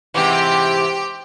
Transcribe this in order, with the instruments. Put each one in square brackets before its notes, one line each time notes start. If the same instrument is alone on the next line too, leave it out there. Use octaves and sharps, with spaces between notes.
[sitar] G#2 C3 E3 [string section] G4 G5